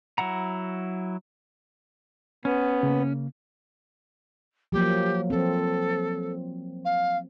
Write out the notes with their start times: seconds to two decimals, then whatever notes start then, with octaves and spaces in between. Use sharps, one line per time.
0.18 F#3 E4 F#5 A#5
2.45 B3 C#4
2.83 C#3 A#3
4.72 F3 F#3 A#3 G4
5.30 F3 C4 A4
6.85 F5